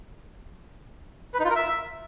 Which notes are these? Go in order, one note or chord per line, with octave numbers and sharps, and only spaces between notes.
B4
D#4
F4
A#4
E5